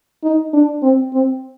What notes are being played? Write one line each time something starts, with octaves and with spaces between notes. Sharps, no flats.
D#4
D4
C4
C4